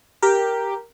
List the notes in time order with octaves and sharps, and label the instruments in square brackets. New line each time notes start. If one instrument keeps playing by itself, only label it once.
[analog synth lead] G4 [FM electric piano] A#4